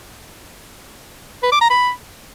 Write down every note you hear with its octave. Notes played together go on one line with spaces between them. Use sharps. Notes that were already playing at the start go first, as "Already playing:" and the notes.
B4
D6
A#5
B5